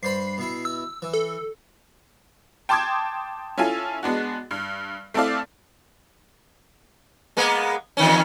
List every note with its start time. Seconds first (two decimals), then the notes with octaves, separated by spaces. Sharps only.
0.03 G2 C5 B5 C7
0.38 B2 E4
0.65 E6
1.02 E3
1.13 A4
2.69 G5 A5 C6 D6 D#6 G#6
3.58 C#4 E4 F4 A4 G#5
4.03 G#3 B3 D4 F#4
4.51 G2
5.14 A3 C4 E4 A4 D5 F5
7.37 G#3 A#3 B3
7.97 E2 D#3 C#4